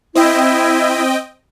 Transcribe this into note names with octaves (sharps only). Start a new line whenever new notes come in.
C4 E4 D#5 G5